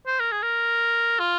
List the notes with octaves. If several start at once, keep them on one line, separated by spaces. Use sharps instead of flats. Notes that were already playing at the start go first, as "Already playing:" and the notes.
C5
A#4
G#4
A#4
F4